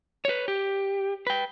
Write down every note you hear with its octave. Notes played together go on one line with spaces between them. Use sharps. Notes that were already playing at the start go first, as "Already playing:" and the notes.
B4 C#5
G4
B4 G5